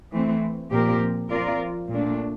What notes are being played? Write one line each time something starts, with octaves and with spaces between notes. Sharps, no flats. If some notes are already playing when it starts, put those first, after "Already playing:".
E3 A3 C4
A#2 F3 C4 G4 A#4
F3 C4 F4 A#4 D5
A#2 A3 D4